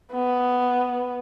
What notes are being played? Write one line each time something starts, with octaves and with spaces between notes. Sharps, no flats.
B3